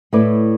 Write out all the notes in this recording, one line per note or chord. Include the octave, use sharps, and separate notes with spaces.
A2 A3 E4 B4 D5